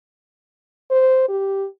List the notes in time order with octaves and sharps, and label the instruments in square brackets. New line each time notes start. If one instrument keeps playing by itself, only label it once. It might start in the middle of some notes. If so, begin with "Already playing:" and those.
[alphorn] C5
G4